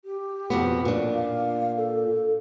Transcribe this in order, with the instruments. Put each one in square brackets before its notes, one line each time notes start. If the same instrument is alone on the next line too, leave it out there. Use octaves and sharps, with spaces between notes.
[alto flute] G4
[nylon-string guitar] F2 B2 B3
A#2 D4
[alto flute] F5
A4